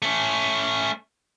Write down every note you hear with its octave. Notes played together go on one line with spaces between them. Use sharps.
A3 C#4